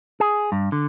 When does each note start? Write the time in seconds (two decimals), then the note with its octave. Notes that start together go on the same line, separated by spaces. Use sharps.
0.20 G#4
0.52 G2
0.72 D3